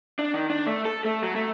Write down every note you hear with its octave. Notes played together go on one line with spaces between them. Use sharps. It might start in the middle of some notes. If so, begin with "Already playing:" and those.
D4
D#3
D4
A3
A4
A3
F#3
A3